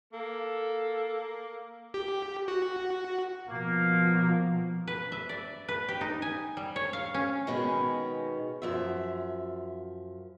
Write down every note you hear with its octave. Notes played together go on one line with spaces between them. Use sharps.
A#3 A4
G4
F#4
B2 F3 A#3
B4
E5
D5
B4
G4
D#4
G#5
G3
C#5
F5
C#4
B2 D#3 G#3 C#4
F#2 F3 E5